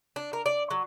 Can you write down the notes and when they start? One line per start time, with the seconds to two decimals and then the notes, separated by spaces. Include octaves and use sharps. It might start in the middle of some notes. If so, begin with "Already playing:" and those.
0.16 D4
0.33 A#4
0.46 D5
0.71 F#3